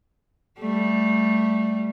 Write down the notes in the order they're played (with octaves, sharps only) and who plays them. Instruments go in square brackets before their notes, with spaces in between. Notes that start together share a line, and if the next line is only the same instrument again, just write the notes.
[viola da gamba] G3 A3